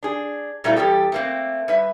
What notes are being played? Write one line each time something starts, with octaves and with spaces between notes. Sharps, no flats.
D4 G#4
A#2 G3 A3 C4 E4 F4
E2 C#3 G3 G4 A4
A3 A#3 C4
G3 B4 E5